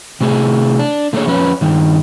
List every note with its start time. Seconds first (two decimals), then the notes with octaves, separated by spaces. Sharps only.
0.21 C3 A3 G#4
0.79 D4
1.13 D3 A3 A#3 G#4 C#5
1.27 F2 C#4 B4
1.61 G2 D#3